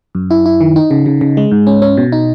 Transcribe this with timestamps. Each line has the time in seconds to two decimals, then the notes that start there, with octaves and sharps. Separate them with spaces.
0.15 F#2
0.31 E4
0.46 E4
0.61 D#3
0.76 D#4
0.91 C#3
1.06 C#3
1.21 C#3
1.37 G#3
1.52 G#2
1.67 C#4
1.82 C#4
1.97 B2
2.12 D#4